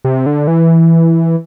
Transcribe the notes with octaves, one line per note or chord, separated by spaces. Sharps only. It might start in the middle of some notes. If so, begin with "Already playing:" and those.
C3
D3
E3